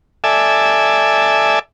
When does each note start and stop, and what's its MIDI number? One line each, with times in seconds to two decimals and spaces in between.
0.24 1.59 69
0.24 1.59 74
0.24 1.59 76
0.24 1.59 80